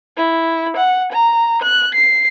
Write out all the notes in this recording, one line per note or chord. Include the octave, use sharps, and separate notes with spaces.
E4
F#5
A#5
F#6
C7